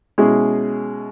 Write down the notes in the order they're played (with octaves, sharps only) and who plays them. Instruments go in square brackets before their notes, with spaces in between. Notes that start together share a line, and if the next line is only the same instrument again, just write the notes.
[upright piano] B2 G#3 C#4 E4 G#4